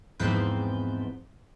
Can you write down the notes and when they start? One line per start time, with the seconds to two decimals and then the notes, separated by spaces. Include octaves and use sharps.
0.20 E2 G#2 F3 C4 B4 G6